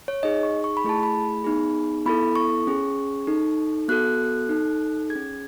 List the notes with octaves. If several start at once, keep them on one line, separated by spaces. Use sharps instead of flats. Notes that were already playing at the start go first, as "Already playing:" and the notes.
C#5
D#4 G#4 D#5
C#6
C#6
B5
A3 E4 G#4 A5
B5
B3 D#4 G#4
B3 E4 A4 B5
C#6
C#4 G#4
D#4 A4
B3 F#4 A4 F#6
D#4 A4
G#4 G#6
C#4